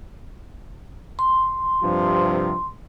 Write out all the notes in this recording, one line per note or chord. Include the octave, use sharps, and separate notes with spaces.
C6
G2 C3 F3